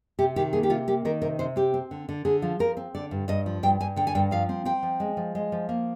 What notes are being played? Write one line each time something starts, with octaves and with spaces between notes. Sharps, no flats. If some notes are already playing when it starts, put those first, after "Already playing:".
C3 G4
D#3 G4
A#3 G#4
G4
C3 F4
A#3 G4
D#3 A#4
C3 A#4
C3 C5
C4 G4
C4
D3
D3
D3 G#4
F3
F3 A#4
C4
D3 D5
G2
G2 D#5
F3
G2 G5
G2 G#5
D3 G5
G#5
G2 G5
F3 F5
C4
C4 G5
F3
G#3
F3
G#3
F3
A#3